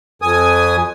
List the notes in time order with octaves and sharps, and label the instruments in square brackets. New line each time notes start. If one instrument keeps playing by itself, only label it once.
[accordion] F2 G#5 D#6